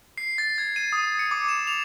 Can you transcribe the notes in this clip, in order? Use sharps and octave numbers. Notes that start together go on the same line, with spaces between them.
C7
A6
G#6
D#7
D#6
C#7
D6
E7
F7